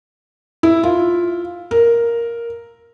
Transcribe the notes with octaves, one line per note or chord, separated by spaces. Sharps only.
E4
F4
A#4